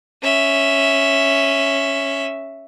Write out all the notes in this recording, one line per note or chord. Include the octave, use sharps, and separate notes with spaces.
C#4 E5